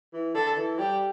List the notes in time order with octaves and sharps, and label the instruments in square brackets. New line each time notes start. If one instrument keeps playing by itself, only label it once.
[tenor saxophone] E3
[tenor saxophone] D3 [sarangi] A4
[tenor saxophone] E3
[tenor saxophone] G3 [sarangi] G4